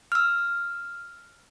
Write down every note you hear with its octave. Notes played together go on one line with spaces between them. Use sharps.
E6 F6